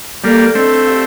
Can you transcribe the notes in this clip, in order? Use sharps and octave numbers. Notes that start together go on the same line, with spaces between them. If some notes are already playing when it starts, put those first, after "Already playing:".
G3 A#3 A4 D5 F5
A3 C4 D4 A4 D#5
G4 D5 F5 C6